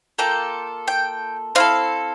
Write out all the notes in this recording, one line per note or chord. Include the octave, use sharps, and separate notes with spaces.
A#3 F4 A4 G5
G5
C4 E4 A4 F5